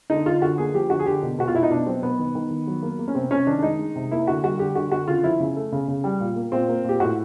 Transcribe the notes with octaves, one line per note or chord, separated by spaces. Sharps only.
D3 D#4
D3 F4
D3 F#4
A#3 G#4
F3 G4
D3 F#4
G#4
D3 G4
B2
B2 F#4
F4
B2 E4
D#4
B2 D4
F#3 C4
B2 B3
D#3
D#3
D#3
F#3
A#3
A#3
C#4
C3 C4
C3 C#4
D#3 D4
D4
G#3 D#4
G#3
C3
A#3 E4
D3 F#4
G3 F#4
D3 G4
D3 F#4
D3 F#4
C#3 F4
F3 E4
C#3
A3
C#3
C#3
G3
A#2
A#3
A#2 C4
A#3
A#2 G4
A2 F#4